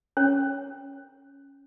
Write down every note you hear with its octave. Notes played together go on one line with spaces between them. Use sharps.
C#4 C#5